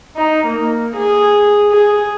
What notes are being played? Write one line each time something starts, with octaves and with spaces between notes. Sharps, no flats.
D#4
A#3
G#4
G#4